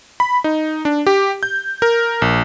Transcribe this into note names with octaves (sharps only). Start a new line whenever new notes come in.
B5
D#4
D4
G4
G6
A#4
A#1